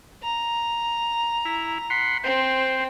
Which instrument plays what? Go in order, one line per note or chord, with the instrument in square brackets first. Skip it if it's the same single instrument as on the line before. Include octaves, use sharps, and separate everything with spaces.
[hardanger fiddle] A#5
[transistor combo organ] E4
F#5 B5 C6
[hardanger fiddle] C4 [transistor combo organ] C5